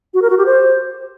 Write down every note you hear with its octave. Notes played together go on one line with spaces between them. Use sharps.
F#4
A#4
F#4
G4
C5